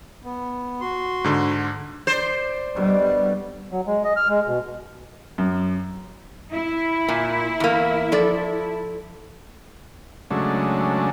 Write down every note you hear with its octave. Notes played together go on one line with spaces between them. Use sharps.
B3
F#4 C6
G#2 D3
C5 D5
B2 D3 G3
F#3
G#3
D#5
F6
G#3
B2
F#2
E4
A#2
E2 A#3
F3 A4 D5
C#3 F#3 G#3 A3 D4